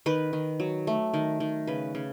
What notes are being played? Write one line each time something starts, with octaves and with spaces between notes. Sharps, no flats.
D#3 B4
D#3
F#3
A3
D#3
D#3
C#3 B4
C#3